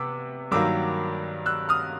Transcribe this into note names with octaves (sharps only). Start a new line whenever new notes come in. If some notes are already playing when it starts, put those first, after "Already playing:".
Already playing: C3 B3 D6 E6
G2 D#3 F#3 A#3 D6 E6
E6 F#6
D#6 F6